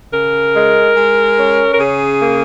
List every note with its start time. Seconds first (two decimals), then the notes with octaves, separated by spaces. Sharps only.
0.13 C#3 A#4
0.54 G#3
0.96 G#3
1.38 C#4
1.73 A#4
1.79 C#3 G#4
2.21 A#3